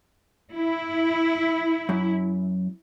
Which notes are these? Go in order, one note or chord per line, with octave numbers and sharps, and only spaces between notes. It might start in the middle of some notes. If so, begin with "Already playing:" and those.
E4
F#2